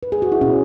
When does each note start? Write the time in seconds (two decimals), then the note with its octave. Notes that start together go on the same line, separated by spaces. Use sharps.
0.03 B4
0.12 G#4
0.22 F#4
0.32 E4
0.41 B2 C#4